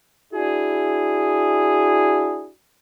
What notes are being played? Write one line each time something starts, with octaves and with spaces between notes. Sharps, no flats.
D4 E4 F#4 G#4